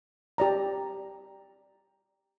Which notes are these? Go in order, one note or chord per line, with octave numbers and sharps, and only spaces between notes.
G4 D5 A#5